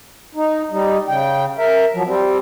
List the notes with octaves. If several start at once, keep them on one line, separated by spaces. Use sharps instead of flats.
D#4
G3 D#4
C#3 G5
A#4 E5
F3 F#3
G3 C4